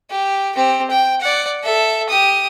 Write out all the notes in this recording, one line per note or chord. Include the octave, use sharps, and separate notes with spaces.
G4
C4 G4
G5
D5 F#5
A4 E5
G4 D#6